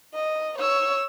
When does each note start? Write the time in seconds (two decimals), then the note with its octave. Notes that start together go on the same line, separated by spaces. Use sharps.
0.14 D#5
0.59 C#5 E6